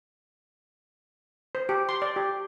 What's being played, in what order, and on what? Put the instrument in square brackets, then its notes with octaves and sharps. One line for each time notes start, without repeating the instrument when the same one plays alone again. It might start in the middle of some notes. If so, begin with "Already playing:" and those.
[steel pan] C5
G4
C6
D5
G4